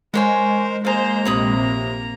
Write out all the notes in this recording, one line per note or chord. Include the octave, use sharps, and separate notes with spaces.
G#3 F4 A#4 C5 C#5 G#5
A#3 G#4 C5 F5 A#5
A#1 C3 C#5 B5 D#6